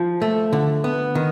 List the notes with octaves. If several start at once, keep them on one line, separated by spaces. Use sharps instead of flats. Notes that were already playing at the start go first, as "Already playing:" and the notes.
Already playing: F3
A3
D3
B3
D#3